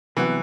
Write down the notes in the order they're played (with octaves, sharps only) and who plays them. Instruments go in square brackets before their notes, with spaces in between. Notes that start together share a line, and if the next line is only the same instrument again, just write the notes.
[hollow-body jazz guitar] C2 C3 F#3 B3 F#4 [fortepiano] E3